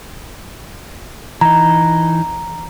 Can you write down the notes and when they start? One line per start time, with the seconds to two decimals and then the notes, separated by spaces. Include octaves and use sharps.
1.41 E3 D#4 A#5